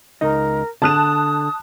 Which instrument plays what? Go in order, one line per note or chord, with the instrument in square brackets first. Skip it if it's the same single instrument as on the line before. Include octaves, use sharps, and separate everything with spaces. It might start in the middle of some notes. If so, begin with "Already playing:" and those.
[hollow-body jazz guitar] C#2 D#4 D#5 [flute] A#4
[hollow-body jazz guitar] D3 [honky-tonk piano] A5 F#6 E7 [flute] D#6